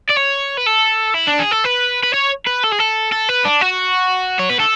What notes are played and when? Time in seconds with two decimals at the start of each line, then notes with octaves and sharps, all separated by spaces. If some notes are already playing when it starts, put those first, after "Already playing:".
0.09 D5
0.16 C#5
0.57 B4
0.66 A4
1.14 E4
1.28 D4
1.40 G#4
1.52 A4
1.65 B4
2.03 B4
2.14 C#5
2.46 B4
2.63 A4
2.71 G#4
2.79 A4
3.12 A4
3.29 B4
3.45 D4
3.61 F#4
4.39 C#5
4.49 B4
4.60 A4